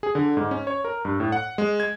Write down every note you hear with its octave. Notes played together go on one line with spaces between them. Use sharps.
G#4
D3
G#2
C#4
C#5
A#4
G2
A2
F#5
G#3
G#6